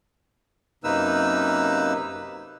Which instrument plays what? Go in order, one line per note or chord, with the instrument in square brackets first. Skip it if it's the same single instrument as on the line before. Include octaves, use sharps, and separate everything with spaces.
[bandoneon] F#2 C3 A#3 D#4 B4 E6